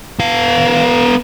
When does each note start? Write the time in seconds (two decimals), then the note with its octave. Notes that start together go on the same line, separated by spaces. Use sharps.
0.20 B3 F5